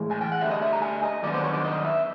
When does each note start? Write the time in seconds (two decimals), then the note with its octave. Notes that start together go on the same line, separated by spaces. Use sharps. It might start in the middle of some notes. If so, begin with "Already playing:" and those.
Already playing: A2 E3 G#3
0.11 G#5
0.21 G5
0.32 F#5
0.41 D2 D3 G3 E5
0.51 D#5
0.62 E5
0.73 A#5
0.82 G#5
1.03 D#5
1.23 G2 D#3 F#3 B3 D4 D5
1.33 C5
1.43 C#5
1.53 D5
1.65 D#5
1.85 E5